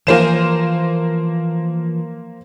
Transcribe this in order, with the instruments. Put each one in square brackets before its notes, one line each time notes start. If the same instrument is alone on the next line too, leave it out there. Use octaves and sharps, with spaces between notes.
[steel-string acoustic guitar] E3 F3 G#5 [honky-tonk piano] A#3 C5 E7